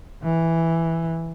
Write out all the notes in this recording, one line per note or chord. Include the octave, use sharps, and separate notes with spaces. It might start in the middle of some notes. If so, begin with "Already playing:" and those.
E3